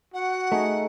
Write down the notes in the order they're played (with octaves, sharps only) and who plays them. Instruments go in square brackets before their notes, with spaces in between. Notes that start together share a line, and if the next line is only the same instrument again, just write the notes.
[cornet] F#4 [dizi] F#5
[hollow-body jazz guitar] A3 [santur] D#4 G#4 D#5